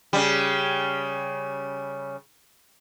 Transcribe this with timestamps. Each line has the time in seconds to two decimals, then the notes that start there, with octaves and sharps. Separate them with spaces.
0.13 C#3 G3